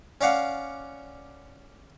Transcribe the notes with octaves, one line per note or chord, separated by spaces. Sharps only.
C#4 D5 F5 F#5